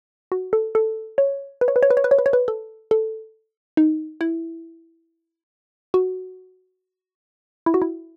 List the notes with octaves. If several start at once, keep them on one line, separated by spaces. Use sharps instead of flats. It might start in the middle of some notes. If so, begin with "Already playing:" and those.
F#4
A4
A4
C#5
B4
C#5
B4
C#5
B4
C#5
B4
C#5
B4
C#5
B4
A4
A4
D#4
E4
F#4
E4
F#4
E4